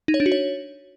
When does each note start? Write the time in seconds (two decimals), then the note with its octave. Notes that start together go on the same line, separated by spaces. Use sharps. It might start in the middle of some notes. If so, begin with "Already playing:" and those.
0.08 D#4
0.14 C#5
0.20 D4
0.26 F#4
0.32 C#5